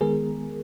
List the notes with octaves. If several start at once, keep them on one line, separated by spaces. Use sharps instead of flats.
D#3 G#3 B3 G#4 A#4